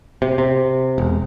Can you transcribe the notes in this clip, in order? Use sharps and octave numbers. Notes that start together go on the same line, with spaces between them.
C3
C3
E1